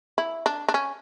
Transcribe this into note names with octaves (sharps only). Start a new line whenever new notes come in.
E4
D4
D4
C#4